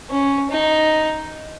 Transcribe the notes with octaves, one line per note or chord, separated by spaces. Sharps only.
C#4
D#4